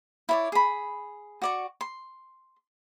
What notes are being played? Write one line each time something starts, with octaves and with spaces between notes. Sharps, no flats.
E4 C#5 D5
G#4 B5
F#4 D5 C#6
C6